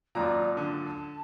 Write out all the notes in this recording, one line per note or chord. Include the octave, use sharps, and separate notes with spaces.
G#1 F#2 A#2 D5 A#5
D3 A5